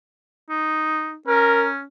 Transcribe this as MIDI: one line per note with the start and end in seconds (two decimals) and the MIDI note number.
0.50 1.16 63
1.28 1.84 61
1.28 1.67 70